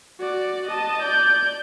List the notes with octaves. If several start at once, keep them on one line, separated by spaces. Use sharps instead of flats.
F#4 D5
D#5 A5
D5 G6